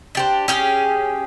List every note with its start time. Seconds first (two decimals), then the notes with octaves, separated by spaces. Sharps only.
0.15 D4 G4 C5
0.48 C#4 G4 G#4